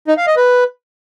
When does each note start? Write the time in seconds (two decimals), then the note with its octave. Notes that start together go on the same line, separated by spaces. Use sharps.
0.08 D#4
0.17 F5
0.27 D#5
0.37 B4